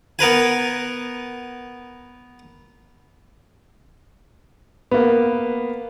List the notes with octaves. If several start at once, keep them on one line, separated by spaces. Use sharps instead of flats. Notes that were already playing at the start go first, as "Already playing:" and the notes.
B3 A#4 B4 G#5
A#3 B3